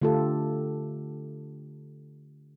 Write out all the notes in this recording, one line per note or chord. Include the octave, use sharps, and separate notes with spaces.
D3 A3 F4 G4 A4